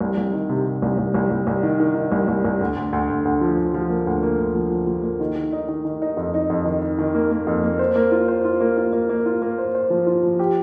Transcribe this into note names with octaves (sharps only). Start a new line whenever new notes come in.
C2
C2
D#3
C3
C3
C2
C2
C2
C2
C2
D#3
D#3
D#3
C2
C2
C2
D2
D2
D2
D2
D2
F3
D2
F3
A#3
D2
A#3
D2
F3
F3
F3
A#3
D#3
D#3
D#4
D#3
D#3
D#4
F2
D#4
F2
D#3
D#3
D#3
A#3
A#3
F2
A#3
C5
A#3
F4
C5
F4
A#3
F4
A#3
A#3
F4
A#3
C5
C5
F3
F4
F3
G4